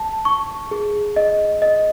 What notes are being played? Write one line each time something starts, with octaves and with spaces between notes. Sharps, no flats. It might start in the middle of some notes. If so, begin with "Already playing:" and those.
Already playing: A5
C#6
G#4
D#5
D#5